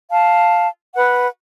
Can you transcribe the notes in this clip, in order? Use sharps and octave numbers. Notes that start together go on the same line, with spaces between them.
F5 A5
B4 F#5